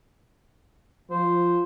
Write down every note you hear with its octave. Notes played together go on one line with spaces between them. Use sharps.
F3 C5